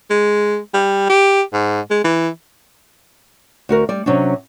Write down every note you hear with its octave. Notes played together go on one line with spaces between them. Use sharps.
G#3
G3
G4
G#2
G#3
E3
D2 F#4 A#4
G3 D5
C3 F#3 C#4 D4